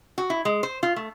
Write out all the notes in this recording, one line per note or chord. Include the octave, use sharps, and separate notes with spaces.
F#4
E4
G#3
C5
F4
A3